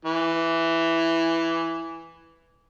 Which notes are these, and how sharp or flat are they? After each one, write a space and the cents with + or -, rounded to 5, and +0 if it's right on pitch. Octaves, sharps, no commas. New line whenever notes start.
E3 +5